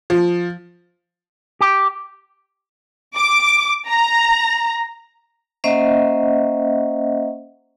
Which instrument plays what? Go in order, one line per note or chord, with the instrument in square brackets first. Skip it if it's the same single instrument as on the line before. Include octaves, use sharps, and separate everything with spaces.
[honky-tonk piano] F3
[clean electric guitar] G4
[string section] D6
A#5
[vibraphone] A#3 C#4 C5 D#5 E5 F#5